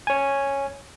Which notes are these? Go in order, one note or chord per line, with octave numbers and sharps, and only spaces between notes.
C#5 G#5